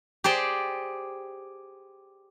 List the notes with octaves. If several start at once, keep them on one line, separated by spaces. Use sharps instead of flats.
G4 G#4 C5 D5